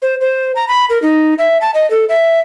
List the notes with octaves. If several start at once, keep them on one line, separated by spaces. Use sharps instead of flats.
C5
C5
A#5
B5
A#4
D#4
E5
A5
D#5
A4
E5